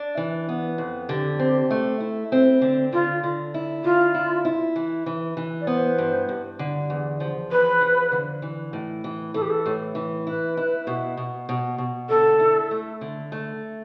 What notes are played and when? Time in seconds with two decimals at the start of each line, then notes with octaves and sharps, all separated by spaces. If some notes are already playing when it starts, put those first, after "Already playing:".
Already playing: D4
0.17 E3
0.49 B3
0.78 F2
1.09 D3 G4
1.39 C4
1.70 A3
2.00 E4
2.32 C4
2.61 D3
2.93 D3 F4
3.23 D3
3.54 E4
3.84 D3 F4
4.14 E4
4.45 E4
4.76 E3
5.06 E3
5.37 E3
5.61 D5
5.67 B3 C5
5.98 G2
6.29 G2
6.59 D3
6.90 E2
7.20 F3
7.51 E2 B4
7.81 F3
8.12 D3
8.42 E3
8.73 A2
9.04 E3
9.34 E3 A4
9.42 G4
9.50 A4
9.66 A2
9.95 E3
10.27 E4 B4
10.57 E4
10.87 B2
11.17 B2
11.49 B2
11.78 B2
12.09 D3 A4
12.40 E4
12.71 A3
13.01 D3
13.32 A3